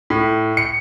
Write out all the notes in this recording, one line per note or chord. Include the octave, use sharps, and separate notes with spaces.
A2
C#7